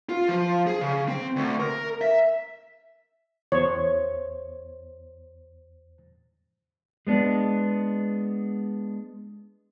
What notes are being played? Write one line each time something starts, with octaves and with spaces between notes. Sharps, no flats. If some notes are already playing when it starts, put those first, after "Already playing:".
F4
F3
G#4
C#3
C4
D2
A#4
E5
E2 C5 C#5
G#3 B3 D4